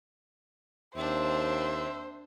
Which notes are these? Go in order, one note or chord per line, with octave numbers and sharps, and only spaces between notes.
D#2 C4 D4 C5 E5